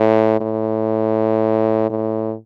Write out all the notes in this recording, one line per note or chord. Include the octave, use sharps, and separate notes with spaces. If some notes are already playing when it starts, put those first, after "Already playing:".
Already playing: A2
A2
A2